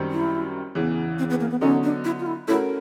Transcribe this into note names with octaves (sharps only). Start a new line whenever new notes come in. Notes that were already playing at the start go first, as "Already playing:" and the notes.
Already playing: F#2 D#3 G3 C4
E4
E2 C#3 E3
C4
B3
A#3
B3
D3 F#3 B3 C#4 D#4
D4
E4
F4
E4
A3 C#4 E4 F#4 A#4